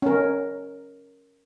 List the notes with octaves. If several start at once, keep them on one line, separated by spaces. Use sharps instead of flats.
C#4 A#4